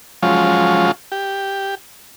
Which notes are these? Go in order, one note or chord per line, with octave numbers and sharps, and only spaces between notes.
F3 F#3 G#3 C#4 F4
G4